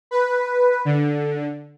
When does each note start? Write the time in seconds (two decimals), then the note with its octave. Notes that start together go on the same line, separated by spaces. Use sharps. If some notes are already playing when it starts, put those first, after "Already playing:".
0.11 B4
0.85 D3